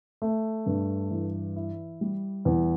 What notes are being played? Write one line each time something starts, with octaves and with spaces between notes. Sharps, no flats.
A3
G2
E3
E4
G3
E2